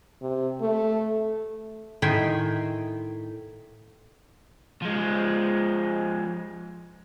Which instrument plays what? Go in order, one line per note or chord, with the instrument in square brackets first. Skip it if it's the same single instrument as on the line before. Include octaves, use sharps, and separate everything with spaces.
[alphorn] C3
A3
[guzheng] A2 D#3 E5 G5 G#5 C6
[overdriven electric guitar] F3 G#3